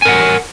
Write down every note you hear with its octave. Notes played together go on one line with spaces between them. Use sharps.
A#4 F#5 G#5